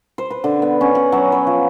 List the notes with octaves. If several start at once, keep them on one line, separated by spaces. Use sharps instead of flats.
C5
B4
D3
B3
C#4
F#5
F#3
B4
F3